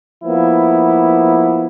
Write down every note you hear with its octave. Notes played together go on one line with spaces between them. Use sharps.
F3 A#3 B3 E4